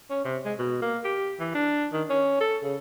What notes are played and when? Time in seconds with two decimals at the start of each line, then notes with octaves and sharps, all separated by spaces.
0.10 C#4
0.25 C3
0.45 G#3
0.59 B2
0.82 A#3
1.05 G4
1.40 E3
1.55 D4
1.93 D#3
2.10 C#4
2.41 A4
2.63 C#3